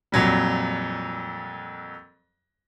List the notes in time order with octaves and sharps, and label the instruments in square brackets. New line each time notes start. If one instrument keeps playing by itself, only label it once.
[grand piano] F2 A#2 F#3 G3